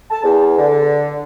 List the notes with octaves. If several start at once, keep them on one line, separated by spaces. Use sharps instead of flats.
A5
E2
D3